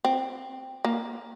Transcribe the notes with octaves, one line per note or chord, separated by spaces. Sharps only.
C4
A#3